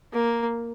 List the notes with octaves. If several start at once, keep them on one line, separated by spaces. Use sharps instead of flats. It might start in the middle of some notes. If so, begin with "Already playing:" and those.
A#3